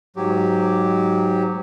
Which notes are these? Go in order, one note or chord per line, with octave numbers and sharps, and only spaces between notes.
G#2 F#3 G4